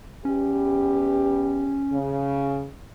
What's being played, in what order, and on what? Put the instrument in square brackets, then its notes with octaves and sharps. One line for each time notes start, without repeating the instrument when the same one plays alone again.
[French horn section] E2 B3 G4 [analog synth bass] C#4
[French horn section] C#3